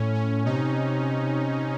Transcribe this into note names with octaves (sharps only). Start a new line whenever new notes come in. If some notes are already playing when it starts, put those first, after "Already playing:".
Already playing: A2 C#4
C#4
C3 D#4